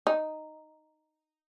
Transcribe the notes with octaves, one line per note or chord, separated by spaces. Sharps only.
D#4